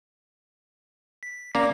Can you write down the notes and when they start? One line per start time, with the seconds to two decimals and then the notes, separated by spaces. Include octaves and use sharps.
1.23 B6
1.55 A#3 C#4 D5 A#5